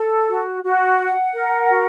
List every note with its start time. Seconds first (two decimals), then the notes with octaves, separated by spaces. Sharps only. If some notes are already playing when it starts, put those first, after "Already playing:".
Already playing: A4
0.29 F#4
0.63 F#4
0.99 F#5
1.34 A#4
1.70 F#4